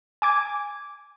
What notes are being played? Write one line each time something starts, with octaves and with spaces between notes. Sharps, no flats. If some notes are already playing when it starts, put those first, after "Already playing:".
G#5 D6 G#6